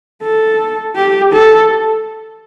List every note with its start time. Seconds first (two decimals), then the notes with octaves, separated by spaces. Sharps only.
0.22 A4
0.96 G4
1.33 A4